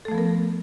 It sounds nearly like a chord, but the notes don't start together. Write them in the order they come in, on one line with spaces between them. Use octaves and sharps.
A4 A3 F3 B3 A#4